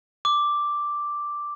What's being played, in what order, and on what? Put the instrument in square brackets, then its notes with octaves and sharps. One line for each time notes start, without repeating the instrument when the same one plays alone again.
[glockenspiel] D6